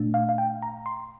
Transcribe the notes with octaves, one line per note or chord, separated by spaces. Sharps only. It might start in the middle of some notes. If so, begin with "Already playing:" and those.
Already playing: A#2 A3 D4
F5
F5
G5
A#5
C6